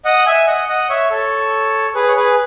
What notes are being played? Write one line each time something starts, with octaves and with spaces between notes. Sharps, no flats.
D#5 F#5
E5 G#5
D#5 F#5
D#5 F#5
C#5 E5
A4 C#5
G#4 B4
C#5
G#4 B4